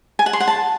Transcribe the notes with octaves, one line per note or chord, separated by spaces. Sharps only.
G#5
F#5
C6
F#5
A5